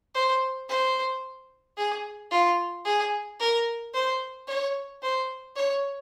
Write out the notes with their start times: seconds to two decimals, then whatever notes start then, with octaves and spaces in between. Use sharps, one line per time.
0.15 C5
0.69 C5
1.77 G#4
2.31 F4
2.85 G#4
3.40 A#4
3.94 C5
4.48 C#5
5.02 C5
5.56 C#5